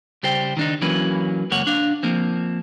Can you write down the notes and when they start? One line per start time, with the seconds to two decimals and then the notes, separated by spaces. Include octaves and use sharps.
0.23 C#3 G3 C5 G5
0.57 D#3 D4 D#4
0.82 E3 F#3 A#3 C#4 B4
1.51 C#2 F#2 A#3 C#5 F#5
1.67 D4 F5
2.03 F3 A#3 C4